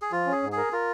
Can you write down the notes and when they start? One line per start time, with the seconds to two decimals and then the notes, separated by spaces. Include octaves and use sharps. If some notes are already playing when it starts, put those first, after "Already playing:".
0.02 G#4
0.12 F3 F4
0.27 C#4
0.32 G#4
0.43 G#2
0.52 G#4 A#4
0.72 F4 A#4